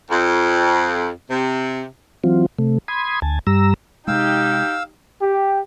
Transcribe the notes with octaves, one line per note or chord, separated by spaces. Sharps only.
F2
C3
E3 F#3 C4 F4
C3 A3
B5 C6 D#6 G#6
D2 G#5 A5
G2 G3 A#5 E6
C3 G#3 D#4 G4 F5 G5 E6
G4